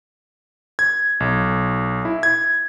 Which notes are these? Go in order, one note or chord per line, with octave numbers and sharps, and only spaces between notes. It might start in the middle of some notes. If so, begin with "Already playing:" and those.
G#6
B1
E4
G#6